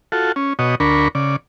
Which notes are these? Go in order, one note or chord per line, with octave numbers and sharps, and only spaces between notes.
F4 F#4 A4
C#4
B2 F#4 C#5 D#5
D2 D4 A#4 B5 C#6
C#3 D5